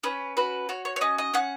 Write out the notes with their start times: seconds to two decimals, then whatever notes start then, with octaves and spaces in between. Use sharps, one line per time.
0.04 C#4 B4
0.37 F#4 B4
0.69 F#4 C#5
0.85 C#5
0.96 C#5
1.01 C#4 D#5
1.18 D#5
1.34 C#4 F#5